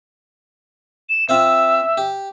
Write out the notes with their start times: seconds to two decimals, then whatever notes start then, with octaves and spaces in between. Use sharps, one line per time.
1.09 E7
1.29 C4 F4 C5 E5
1.97 G4